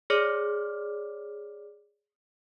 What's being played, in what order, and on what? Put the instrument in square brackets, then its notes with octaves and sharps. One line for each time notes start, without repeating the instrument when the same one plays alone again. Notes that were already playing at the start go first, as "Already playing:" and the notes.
[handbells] G#4 C#5 D5 D6 F6